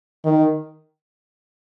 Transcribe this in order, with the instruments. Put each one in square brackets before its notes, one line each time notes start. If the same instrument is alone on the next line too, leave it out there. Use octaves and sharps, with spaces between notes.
[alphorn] D#3